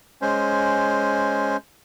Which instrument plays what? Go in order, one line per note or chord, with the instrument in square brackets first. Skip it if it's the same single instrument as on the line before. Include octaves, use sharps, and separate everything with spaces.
[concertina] G#3 C#4 C5